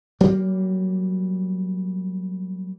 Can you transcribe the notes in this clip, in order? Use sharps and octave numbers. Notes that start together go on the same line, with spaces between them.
F#3 G3 A#3